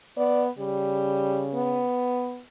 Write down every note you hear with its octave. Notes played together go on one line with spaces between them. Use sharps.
B3 D5
C#3 G3
B3